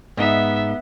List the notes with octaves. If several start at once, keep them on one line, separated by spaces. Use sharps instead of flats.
G#2 B3 D#4 E5